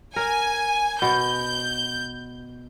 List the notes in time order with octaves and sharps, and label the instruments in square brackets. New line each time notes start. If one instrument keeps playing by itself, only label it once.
[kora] A#4 [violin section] G#5
[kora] B2 [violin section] G6